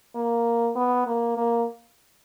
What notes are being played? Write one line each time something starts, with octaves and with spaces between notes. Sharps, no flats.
A#3
B3
A#3
A#3